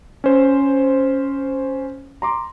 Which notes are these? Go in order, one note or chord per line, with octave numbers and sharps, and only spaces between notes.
C#4 C5
A#5 C6 D6